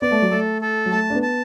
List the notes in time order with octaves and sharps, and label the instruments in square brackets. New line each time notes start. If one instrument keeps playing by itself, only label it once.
[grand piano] B3 [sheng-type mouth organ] D5
[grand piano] A3
F#3
[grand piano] A3 [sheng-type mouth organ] A4
[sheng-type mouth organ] A4
[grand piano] F#3
[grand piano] A3 [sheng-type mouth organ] A5
[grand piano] D4
B3
[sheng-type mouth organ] A5